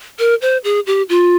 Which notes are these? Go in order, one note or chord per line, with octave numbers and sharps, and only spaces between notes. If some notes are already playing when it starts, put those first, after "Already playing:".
A#4
C5
G#4
G4
F4